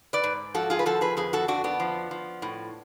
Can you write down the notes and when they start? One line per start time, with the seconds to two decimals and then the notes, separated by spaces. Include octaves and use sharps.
0.13 B4 D5
0.24 G#2
0.55 F3 F#4 A4
0.70 F4 G#4
0.79 B4
0.86 F3 F#4 A4
1.01 G#4 B4
1.17 F2 G#4 B4
1.33 F#4 A4
1.48 F2 D4 F#4
1.64 B3 D4
1.80 F3
2.11 F3
2.42 A2